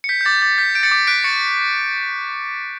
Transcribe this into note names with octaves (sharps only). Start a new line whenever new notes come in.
C#7
G6 B6
G6
D6 A6
D6 A6
G6 B6
G6 D7
A6 C#7
D6
F#6 B6 D7
C#6 A6 C#7